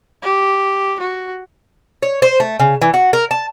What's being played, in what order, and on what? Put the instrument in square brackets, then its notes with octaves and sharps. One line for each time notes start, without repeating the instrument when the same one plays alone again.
[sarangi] G4
F#4
[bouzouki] C#5
C5
A3
C#3
E3
F#4
A#4
A5